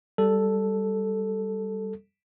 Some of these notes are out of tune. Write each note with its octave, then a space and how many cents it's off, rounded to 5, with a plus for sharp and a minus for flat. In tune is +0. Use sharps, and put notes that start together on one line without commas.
G3 -5 A4 +0